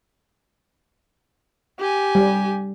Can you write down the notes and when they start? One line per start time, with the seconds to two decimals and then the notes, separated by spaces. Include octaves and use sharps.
1.79 G4 G#5
2.15 G3